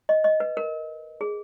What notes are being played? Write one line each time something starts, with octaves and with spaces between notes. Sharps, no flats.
D#5
D#5
B4
A#4
G#4